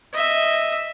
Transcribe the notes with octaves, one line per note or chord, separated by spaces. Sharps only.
D#5 E5